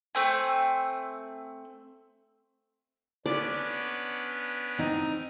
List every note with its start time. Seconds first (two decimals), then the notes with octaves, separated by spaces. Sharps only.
0.15 A3 C4 G#5
3.26 B3 C#4 D4 D5
4.79 C4 D#4